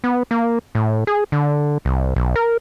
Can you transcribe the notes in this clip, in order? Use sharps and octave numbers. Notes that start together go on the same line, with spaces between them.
B3
A#3
A2
G#4
D3
C2
B1
A#4